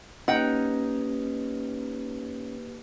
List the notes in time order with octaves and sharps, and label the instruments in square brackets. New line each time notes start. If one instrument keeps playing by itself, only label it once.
[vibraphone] A#3 G4 B4 [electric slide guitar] C#4 [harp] D#4 [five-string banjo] F#5 G5